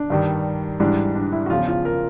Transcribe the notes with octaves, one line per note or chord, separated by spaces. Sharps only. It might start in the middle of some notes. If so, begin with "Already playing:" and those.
Already playing: D4
G2 D#3 G3
G#2 E3 G3 D4
D4
E4
F#4
E2 C#3 F3 F4
F4
A#4